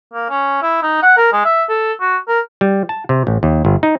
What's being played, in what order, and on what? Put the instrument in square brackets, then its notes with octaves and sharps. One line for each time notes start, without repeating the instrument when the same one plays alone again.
[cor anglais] A#3
C#4
E4
D#4
F#5
A#4
G#3
E5
A4
F#4
A#4
[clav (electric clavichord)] G3
A5
C3
A1
D#2
G1
D#4